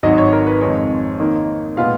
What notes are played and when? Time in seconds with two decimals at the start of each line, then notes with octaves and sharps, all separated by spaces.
0.03 G#1 G#2 F#3 D#5
0.18 C#5
0.33 A#4
0.47 B4
0.60 F2 D#3 G#3 C#5
1.19 G#2 D#3 A#3 D#4
1.77 A#2 G#3 B3 F4 F5